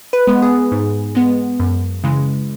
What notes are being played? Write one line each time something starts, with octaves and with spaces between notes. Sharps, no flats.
B4
G#3 B3
G#4
G#2
G#3 B3
F#2
C#3 E3 G#3